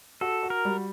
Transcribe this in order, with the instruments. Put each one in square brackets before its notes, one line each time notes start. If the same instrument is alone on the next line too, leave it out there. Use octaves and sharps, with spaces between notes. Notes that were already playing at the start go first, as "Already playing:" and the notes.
[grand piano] F#4 [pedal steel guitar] A4
[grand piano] F#4
[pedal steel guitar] A#4
[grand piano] G3